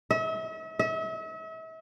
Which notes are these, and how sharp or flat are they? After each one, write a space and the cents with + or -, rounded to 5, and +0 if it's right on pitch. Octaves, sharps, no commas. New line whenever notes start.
E5 -40
E5 -40